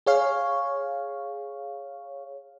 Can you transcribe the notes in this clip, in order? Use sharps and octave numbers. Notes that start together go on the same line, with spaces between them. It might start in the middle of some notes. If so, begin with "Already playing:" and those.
G#4 C#5 F5